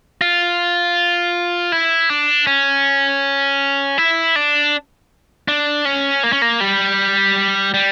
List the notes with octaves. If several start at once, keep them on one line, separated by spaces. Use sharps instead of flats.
F4
E4
D4
C#4
E4
D4
D4
C#4
A#3
C#4
A#3
G3
G3